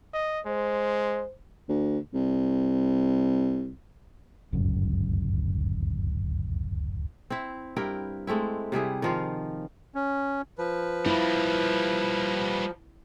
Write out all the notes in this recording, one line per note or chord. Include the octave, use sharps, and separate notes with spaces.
D#5
G#3 C5
D2
C2
D1 G1 C#2 F#2
C4 E4
G2 E4 A#4 G5
G#3 A3 C4 E4
C3 G3 E4 G#4
D#3 F3 F4
C#4
F3 B4
G3 A#3 E4